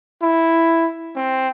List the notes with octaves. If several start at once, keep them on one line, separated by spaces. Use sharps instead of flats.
E4
C4